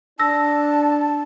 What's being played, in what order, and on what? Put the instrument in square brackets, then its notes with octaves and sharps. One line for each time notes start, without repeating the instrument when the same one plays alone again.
[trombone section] D4 [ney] A5 [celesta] E6 A#6